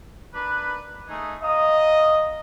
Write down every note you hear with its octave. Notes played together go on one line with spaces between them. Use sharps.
D4 A#4 B4
A3 D#4 G#4
D#5 F5 A#5 D#6